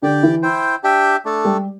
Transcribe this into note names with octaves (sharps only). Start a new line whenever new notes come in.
D3 D4 G4 D5 G5
E3 E4
E4 C5 G5
D4 G4 E5 G5
A3 D4 A4
G3 G4